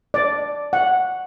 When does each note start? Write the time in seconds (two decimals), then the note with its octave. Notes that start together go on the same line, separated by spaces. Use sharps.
0.14 D5
0.73 F#5